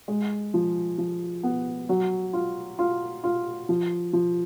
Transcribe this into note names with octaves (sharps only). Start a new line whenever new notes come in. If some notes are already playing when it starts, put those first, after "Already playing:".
G#3
F3
F3
B3
F#3
F4
F4
F4
F3
F3